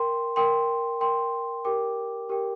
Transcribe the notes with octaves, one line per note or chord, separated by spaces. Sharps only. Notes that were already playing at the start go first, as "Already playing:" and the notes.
Already playing: A#4 G5 C6
A#4 G5 C6
A#4 G5 C6
G4 A#4 G5 D6
G4 A#4 G5 D6